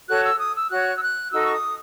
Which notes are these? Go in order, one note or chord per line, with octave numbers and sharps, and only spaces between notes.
F#4 A4 C#5 F#6
E6
D#6
E6
F#4 C#5 F#6
E6
F#6
D#4 F#4 A4 E6
C#6
D#6